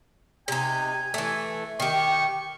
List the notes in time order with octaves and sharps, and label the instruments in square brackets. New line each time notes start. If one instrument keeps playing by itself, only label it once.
[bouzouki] C3 D#4 [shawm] G#5
[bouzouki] E3 A3
[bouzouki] D#3 G4 [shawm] C#6